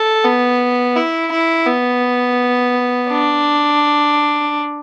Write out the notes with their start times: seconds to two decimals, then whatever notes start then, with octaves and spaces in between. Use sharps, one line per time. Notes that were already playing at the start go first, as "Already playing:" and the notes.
Already playing: A4
0.24 B3
0.96 E4
1.32 E4
1.67 B3
3.10 D4